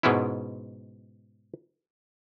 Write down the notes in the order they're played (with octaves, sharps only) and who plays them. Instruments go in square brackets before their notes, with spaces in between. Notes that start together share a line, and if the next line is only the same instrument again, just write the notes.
[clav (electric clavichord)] G#2 B2 G#3 B3 C#4 E4